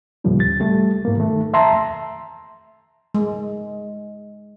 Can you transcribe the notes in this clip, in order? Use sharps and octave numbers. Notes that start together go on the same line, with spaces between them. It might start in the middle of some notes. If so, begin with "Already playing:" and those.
D#2 A2 C#3 F3 G3 A#3
A6
G3 A3
G#2 A#3
D#3 A3
E5 A5 A#5 C6
G#3